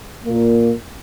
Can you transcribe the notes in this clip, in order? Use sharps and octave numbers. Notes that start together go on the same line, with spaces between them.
A#2 A#3